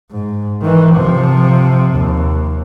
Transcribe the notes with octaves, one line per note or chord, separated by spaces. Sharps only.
G#2
D#3 E3
C3 F3
D#2